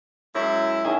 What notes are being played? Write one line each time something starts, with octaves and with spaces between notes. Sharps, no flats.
F#2 G#3 E4
D#3 C#4 G#4 D#5 E5